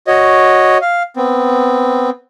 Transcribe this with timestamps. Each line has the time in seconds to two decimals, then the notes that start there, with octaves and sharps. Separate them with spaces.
0.07 F#4 C#5 D#5
0.81 F5
1.16 B3 C4